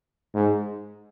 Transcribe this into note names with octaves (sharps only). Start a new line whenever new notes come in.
G#2